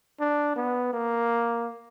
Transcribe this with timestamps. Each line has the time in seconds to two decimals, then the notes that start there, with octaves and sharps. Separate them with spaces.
0.20 D4
0.56 B3
0.93 A#3